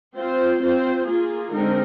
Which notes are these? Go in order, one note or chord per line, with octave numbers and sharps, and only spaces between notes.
C4 F4 C5
C4 F4 C5
A#3 F4 G#4
D3 G#3 C4 D#4 A#4